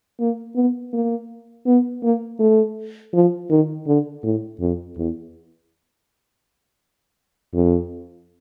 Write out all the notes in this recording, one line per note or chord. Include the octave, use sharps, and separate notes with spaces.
A#3
B3
A#3
B3
A#3
A3
F3
D#3
D3
A2
F2
E2
F2